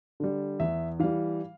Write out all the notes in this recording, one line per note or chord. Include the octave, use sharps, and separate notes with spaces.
D3 G3
E2 E5
E3 G3 F5